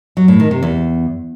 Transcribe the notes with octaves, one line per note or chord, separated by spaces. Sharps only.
F#3
A2
D#3
C3
E2